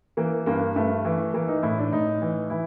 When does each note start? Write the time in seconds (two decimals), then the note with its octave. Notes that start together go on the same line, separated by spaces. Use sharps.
0.17 E3 A#3
0.46 G2 A#3
0.76 G2 A3
1.05 E3
1.33 E3 A#3
1.48 D#4
1.63 A2 E4
1.78 D4
1.92 A2 D#4
2.22 E3
2.50 E3 E4